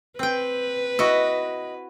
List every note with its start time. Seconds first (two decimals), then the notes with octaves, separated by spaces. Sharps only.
0.19 C4 B4 G5
0.99 E4 F#4 D#5